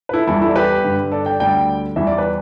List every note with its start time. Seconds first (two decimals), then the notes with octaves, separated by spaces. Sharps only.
0.09 B4
0.14 E4 A4
0.27 E2 E3 G3 E4 A4
0.42 E4 A4
0.49 D5
0.56 G4 B4
0.84 G2 D3 G3
1.12 A4 D5
1.26 D5 G5
1.40 D2 D3 G3 D5 G5
1.96 E2 E3 G3 E5
2.07 D5
2.18 B4